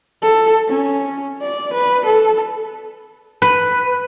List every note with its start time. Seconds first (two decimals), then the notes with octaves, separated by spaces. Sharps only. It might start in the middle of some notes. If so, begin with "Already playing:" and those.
0.22 A4
0.68 C#4
1.42 D5
1.74 B4
2.06 A4
3.42 B4